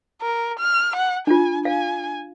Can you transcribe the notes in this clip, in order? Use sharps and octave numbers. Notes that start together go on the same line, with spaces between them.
A#4
F6
F#5
D4 F4 G#5
F5 G#5